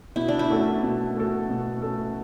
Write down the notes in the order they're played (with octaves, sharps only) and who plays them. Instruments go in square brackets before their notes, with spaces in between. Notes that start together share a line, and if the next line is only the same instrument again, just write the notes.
[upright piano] B2 [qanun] E4
[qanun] D4
E4
[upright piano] A3 C#4 F#4 A4
B2
A3 C#4 F#4 A4
B2
A3 C#4 F#4 A4